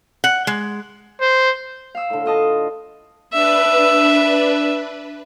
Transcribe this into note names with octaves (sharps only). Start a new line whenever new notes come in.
F#5
G#3
C5
F5 E6
A2 D3
F4 D#5 A5
D4 B4 E5